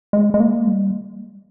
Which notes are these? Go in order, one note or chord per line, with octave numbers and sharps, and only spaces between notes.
G#3
G#3
A#3
G3